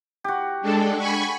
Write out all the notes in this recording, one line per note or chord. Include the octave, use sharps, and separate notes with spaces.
F#4 G4
G#3 D4 A4
G#5 B5 C#6